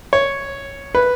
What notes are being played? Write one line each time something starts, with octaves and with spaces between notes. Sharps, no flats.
C#5
B4